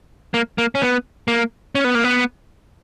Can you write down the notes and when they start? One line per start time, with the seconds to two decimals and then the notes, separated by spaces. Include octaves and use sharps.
0.34 A#3
0.58 A#3
0.75 C#4
0.82 B3
1.28 A#3
1.75 C#4
1.84 B3
1.95 A#3
2.04 B3